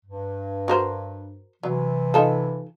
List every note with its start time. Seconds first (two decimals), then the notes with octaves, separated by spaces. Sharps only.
0.06 G2
0.68 F#4 A#4 C5
1.63 C3 E3 F#3
2.14 D#4 F4 A4